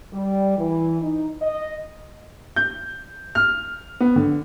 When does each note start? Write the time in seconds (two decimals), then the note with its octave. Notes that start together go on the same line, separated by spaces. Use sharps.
0.13 G3
0.58 E3
1.01 D#4
1.41 D#5
2.56 G6
3.35 F6
4.00 B3
4.16 D3